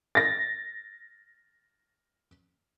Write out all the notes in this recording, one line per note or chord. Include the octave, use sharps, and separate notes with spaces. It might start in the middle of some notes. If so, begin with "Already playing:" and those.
A6 A#6